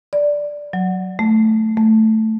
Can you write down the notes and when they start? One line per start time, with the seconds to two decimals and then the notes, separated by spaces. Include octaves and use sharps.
0.13 D5
0.73 F#3
1.19 A3
1.77 A3